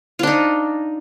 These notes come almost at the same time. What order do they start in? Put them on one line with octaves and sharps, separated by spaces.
F4 D4 D#4